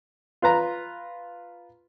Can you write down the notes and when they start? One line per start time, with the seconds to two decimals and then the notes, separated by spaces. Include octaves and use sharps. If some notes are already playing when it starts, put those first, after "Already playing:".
0.42 F4 B4 A#5